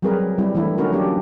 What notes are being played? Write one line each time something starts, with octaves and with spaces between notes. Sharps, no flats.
F#3 G3 C4 G#4 A#4 B4
G3 C4 E4
E3 A3 D4 E4
D3 C#4 D#4 F#4 A#4
F#3 A#3 D4 G4